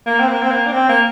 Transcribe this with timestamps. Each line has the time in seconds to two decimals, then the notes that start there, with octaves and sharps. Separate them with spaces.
0.06 A#3
0.20 C4
0.29 A#3
0.42 C4
0.51 A#3
0.67 D4
0.73 C4
0.89 A#3